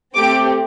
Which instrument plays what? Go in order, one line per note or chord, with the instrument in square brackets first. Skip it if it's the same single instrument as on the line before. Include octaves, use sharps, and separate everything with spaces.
[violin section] A3 C4 G4 D6